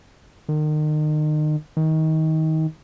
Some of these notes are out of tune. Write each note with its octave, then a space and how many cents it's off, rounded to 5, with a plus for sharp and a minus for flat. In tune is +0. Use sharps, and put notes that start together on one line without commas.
D#3 -35
D#3 +25